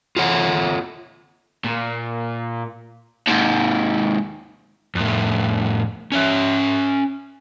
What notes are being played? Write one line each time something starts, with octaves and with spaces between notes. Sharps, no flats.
F4 A4 C#5 F#5
A#2
D#2 G#2
F2 A2
C#4 C#5 E5